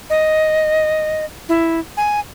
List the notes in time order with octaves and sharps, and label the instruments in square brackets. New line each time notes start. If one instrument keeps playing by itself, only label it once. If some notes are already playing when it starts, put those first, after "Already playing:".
[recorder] D#5
E4
G#5